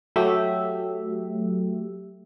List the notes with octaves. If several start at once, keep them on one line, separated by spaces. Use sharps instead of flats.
F#3 A3 G4 E5